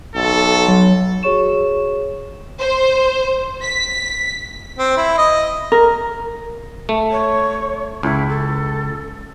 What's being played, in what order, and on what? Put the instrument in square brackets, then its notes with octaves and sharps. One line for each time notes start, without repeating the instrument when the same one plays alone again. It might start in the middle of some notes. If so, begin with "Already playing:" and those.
[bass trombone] B1 [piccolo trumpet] A4
[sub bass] F#3
[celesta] F#4 G#4 C#5 C#6 E7
[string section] C5
B6
[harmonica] C4
E4
D#5
[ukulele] A#4
[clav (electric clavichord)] A3
[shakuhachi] C#5
[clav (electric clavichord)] C#2 [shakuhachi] E4
[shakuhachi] A4